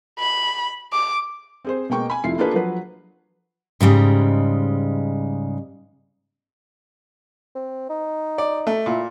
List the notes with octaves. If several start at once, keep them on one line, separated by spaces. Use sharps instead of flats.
B5
D6
C4 G#4 C5
B2 G#3 A#3 G5 C#6
G#5 B5
F1 A3 E4 F4 C7
A#3 D4 F4 G#4 A4 B4
F3 F#3 B4
G#2 C#3 G3 G#3
C4
D#4
D5
A3
A#2 E4